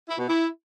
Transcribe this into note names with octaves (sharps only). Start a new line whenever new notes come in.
E4
B2
E4